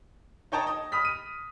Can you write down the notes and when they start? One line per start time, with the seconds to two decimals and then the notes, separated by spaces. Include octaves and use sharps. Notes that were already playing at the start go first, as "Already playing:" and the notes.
0.52 D#4 C#5 G5 A5 A#5 C#6
0.67 D#5
0.92 B5 D#6 F6 B6
1.05 D#7